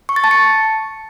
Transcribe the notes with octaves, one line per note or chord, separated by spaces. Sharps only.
C#6
A6
A5
C#7